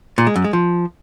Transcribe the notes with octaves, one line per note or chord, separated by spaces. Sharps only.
A#2
G#3
F#2
G#3
F3